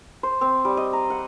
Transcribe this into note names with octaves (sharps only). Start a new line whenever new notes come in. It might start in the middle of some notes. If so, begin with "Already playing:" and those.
C5
C4
G3
D#5
A#5
F#5